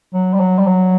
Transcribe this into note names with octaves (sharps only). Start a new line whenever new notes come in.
F#3
G3
F#3
G3
F#3